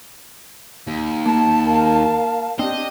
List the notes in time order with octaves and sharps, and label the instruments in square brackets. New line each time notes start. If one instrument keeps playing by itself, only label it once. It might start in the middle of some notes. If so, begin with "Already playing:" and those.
[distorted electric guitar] D#2
[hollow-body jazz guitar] A#3 A#5 [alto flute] A5
[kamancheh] A#4 F5
[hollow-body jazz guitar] C4 [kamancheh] D4 G4 [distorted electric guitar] D#5